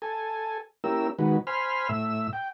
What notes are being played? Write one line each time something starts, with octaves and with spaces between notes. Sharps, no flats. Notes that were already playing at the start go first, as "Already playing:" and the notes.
A4 G#5
A#3 C#4 E4 G4 A#4 E6
D#3 G#3 F#4 B4
C5 G#5 B5 C6 F6
A2 E5 E6
G5